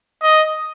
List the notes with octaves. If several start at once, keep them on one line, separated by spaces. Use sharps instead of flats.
D#5